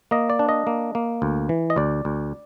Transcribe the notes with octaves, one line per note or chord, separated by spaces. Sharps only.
A#3 D#5
D5
D4
D#5
A#3
A#3
D2
E3
D#5
D2 D5
D2